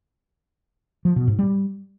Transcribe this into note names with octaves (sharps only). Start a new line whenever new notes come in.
F3
B2
G#2
G3